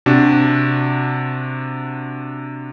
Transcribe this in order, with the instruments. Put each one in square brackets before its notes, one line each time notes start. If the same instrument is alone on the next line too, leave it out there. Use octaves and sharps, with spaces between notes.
[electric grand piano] C3 D4 F#4